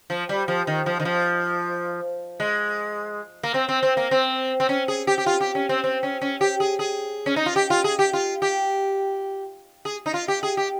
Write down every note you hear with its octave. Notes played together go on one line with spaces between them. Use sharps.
F3
G3
F3
D#3
F3
D#3
F3
G#3
A#3
C4
C4
C4
A#3
C4
C4
C#4
G#4
G4
G4
F4
G4
C#4
C4
C4
C#4
C#4
G4
G#4
G#4
C#4
D#4
F4
G4
F4
G#4
G4
F4
G4
G#4
D#4
F4
G4
G#4
G4